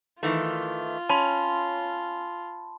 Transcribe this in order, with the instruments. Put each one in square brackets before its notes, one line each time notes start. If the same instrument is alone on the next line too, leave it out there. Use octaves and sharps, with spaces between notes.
[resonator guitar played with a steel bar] D#3 E3 A3 [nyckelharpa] F4
[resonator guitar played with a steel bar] C#4 [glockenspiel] A5 B5 C6